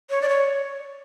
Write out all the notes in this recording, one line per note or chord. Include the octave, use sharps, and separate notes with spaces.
C#5
D5
C#5